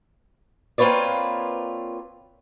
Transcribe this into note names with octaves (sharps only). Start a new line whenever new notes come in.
A#3 C4 F4 B4 C#5 D5